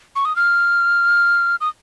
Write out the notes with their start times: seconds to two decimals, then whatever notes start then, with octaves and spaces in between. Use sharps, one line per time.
0.16 C#6
0.25 D#6
0.36 F6
1.61 D#6